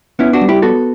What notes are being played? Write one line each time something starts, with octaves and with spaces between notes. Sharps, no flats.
B3 C#4 E4
D4 F#4
G3
E4 G4
B3 F#4 A4